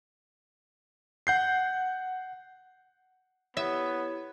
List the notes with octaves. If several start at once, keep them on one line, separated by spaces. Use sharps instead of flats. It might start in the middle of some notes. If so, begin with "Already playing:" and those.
F#5 G6 C7
B3 E4 G4 C#5 E5